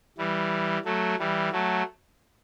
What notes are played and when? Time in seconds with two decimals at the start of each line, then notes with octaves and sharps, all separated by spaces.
0.18 E3 G3
0.85 F#3 A3
1.19 E3 G3
1.52 F#3 A3